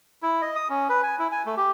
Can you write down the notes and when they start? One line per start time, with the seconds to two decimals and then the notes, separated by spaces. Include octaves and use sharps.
0.23 E4
0.42 D#5
0.56 D#6
0.69 C#4
0.89 B4
1.03 G#5
1.19 E4
1.32 G#5
1.46 A3
1.57 G4